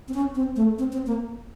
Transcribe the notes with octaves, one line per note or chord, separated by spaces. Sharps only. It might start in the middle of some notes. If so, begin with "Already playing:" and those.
C4
C#4
C4
A3
C4
C4
A#3